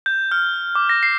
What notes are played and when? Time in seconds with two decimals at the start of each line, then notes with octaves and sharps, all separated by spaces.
0.06 G6
0.31 F6
0.75 D6
0.89 A#6
1.03 C7